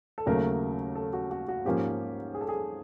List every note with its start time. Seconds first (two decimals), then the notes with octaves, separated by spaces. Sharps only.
0.18 A4
0.26 D#2 C#3 F#3 A3 A#4
0.95 A4
1.13 F#4
1.31 F#4
1.48 F#4
1.65 G#2 F3 A#3 C#4 G4
2.34 G#4
2.41 A4
2.49 G#4